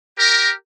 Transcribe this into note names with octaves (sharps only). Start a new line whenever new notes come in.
G4 A#4